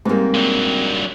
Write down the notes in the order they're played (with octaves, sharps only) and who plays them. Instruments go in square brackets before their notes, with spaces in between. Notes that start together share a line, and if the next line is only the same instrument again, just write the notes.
[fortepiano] G#2 A#3 [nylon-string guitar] G3 C4
[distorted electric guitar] G2 F#3